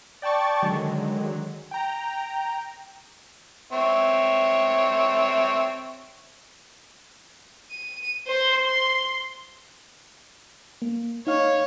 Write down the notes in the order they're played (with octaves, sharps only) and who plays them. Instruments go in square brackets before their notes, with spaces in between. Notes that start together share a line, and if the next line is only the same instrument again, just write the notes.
[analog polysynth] D5 G5 A5 C#6 A6
D3 D#3 F#3 G#3
G5 A#5
[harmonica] C4 C#5 E5
[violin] D#7
C5 C6
C6
[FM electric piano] A#3
[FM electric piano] D#4 F5 [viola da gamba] C#5